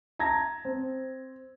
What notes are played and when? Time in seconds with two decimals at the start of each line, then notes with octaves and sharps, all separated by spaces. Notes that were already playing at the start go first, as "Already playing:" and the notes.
0.19 A5 A#5 G#6 A#6
0.65 C4